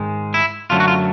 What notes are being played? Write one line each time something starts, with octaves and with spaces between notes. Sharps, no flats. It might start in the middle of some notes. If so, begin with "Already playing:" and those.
Already playing: G#2 D#3 G#3
E4
F#2 D3 F#3 A3 F4
F#4
F4